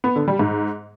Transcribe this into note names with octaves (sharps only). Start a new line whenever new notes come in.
B3
D3
G3
G#2